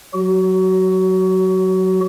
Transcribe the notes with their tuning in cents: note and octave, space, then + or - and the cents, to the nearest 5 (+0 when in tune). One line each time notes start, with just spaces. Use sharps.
F#3 +0 F#4 +25